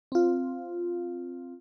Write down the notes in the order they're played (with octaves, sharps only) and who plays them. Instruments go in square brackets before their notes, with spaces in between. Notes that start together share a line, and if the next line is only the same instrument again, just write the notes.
[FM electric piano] C4 F4